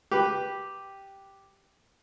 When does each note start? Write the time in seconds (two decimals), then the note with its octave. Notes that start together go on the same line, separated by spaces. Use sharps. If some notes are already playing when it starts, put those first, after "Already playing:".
0.11 G4 B4